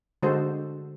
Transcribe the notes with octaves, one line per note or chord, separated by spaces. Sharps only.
D3 G#3 F#4 A4 C5